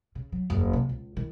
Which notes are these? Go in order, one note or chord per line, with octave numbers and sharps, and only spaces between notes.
C#3
F#3
F#1 E2
C3
C#2
D#3 E4